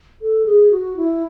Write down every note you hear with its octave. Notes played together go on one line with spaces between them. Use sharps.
A4
G#4
F#4
E4